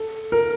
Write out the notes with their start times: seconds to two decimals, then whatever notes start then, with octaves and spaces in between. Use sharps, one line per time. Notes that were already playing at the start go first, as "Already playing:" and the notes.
Already playing: A4
0.32 A#4